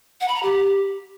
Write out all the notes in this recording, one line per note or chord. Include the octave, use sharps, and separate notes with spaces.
F#5
B5
A#5
G4